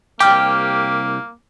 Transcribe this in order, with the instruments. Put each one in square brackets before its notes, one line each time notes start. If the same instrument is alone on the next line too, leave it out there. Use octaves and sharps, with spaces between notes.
[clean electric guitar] C2 G4 [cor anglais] A#3 [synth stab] G5 [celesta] D6 F6